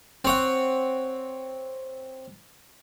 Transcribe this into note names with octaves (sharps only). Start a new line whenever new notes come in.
C4 C#5 F#5